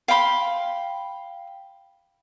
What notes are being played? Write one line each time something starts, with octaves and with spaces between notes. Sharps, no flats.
F5 G5 B5 C6